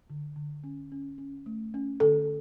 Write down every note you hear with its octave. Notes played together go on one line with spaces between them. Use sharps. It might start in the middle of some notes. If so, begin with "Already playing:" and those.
D3
D3
C#4
C#4
C#4
A3
C#4
D3 A4